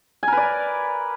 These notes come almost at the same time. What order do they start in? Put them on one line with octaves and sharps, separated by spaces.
G#5 A#4 B4 D5